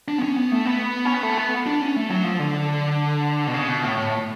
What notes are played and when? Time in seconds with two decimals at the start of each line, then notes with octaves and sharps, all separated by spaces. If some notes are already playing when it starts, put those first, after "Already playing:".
0.08 D4
0.18 B3
0.23 C#4
0.36 B3
0.51 A3
0.65 B3
1.05 C#4
1.14 B3
1.23 A3
1.37 B3
1.66 D4
1.81 C#4
1.96 A3
2.10 F#3
2.24 F3
2.39 D3
3.47 B2
3.54 C#3
3.68 B2
3.83 A2
3.97 A2